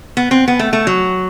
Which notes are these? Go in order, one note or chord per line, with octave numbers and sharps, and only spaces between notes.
B3
C4
B3
A3
A3
F#3